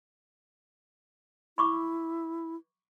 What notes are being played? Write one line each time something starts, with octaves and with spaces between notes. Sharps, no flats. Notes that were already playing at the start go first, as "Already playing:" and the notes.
E4 B5 C#6 D6